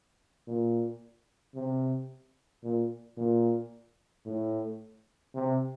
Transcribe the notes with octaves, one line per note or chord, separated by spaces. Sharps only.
A#2
C3
A#2
A#2
A2
C3